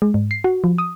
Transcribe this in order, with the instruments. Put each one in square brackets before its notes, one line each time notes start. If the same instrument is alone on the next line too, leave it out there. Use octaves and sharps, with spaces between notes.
[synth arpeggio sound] G#3
G#2
C7
F#4
F3
D#6